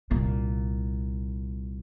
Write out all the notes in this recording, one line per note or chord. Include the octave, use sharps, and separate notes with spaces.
C2 A#2